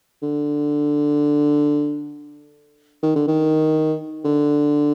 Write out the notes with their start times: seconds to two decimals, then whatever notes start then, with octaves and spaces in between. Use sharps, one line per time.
0.22 D3
3.03 D#3
3.16 D3
3.28 D#3
4.25 D3